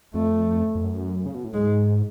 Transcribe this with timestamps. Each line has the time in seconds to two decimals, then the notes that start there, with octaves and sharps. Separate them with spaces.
0.14 F2 A3
0.75 F2
0.84 F#2
1.26 C#3
1.34 B2
1.44 A2
1.54 G#2 G#3